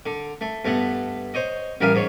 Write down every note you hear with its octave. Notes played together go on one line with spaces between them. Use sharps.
D3
A3
G2 A3 B3 F#5
C5 C#5 D#5
A1 G3 A#4 E5 F5 G#5
G#2 C#5